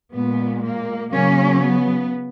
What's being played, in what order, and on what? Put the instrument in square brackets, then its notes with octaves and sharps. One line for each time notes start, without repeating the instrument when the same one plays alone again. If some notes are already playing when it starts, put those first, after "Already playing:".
[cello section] A#2 G#3 B3
A#3
C#3 F#3 A#3 C#4
B3